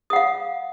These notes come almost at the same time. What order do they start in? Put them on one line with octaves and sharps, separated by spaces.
D#6 F#5 F5